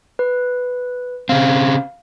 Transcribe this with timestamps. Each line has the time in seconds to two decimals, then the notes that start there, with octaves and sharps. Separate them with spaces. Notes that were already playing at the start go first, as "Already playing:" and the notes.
0.19 B4
1.29 C#3 C4 F5